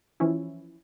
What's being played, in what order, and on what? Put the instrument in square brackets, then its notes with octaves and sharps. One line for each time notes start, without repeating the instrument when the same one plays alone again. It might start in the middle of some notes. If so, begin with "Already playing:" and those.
[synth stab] E3 F3 C#4 E4